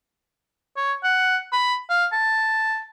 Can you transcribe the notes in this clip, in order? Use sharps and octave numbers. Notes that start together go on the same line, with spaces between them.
C#5
F#5
B5
F5
A5